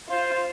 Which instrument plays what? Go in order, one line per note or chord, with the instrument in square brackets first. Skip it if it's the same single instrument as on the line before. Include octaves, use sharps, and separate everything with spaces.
[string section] F4 [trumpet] C5